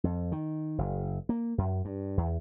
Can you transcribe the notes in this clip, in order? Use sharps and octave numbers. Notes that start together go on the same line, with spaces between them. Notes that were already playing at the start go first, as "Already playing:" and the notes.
F2
D#3
F#1
A#3
F#2
G2
E2